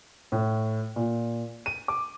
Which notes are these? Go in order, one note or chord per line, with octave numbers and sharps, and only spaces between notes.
A2
A#2
D#7
D6